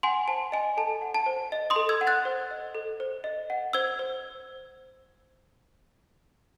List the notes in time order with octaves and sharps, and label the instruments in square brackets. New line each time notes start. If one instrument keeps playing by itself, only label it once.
[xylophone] F#5 G#5 C6
C5 A5
D#5 G#5
A4 A5
F#5
A5
C5
D#5
C6 D#6
A4
E6 G#6
F#5
F#6 A6
C5
D#5
A4
C5
D#5
F#5
C5 E6 G#6
C5